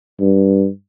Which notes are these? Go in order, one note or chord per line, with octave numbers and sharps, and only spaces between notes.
G2